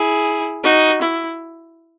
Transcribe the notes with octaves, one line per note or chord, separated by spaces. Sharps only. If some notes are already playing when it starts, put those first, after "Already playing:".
Already playing: E4 G#4
D#4 F#4
E4